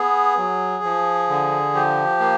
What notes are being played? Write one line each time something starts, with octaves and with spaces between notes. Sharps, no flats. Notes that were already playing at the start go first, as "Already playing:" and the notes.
Already playing: B3 G#4
F#3
F3
D3
F3 G4
A#3